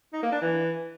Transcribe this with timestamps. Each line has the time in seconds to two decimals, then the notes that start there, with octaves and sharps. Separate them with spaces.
0.13 D#4
0.23 A#3
0.32 D4
0.42 E3